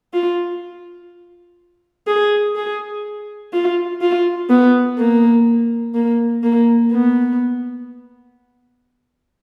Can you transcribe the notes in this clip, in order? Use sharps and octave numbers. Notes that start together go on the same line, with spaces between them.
F4
G#4
G#4
F4
F4
B3
A#3
A#3
A#3
B3